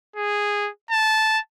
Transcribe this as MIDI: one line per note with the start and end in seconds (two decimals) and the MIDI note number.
0.16 0.70 68
0.91 1.39 81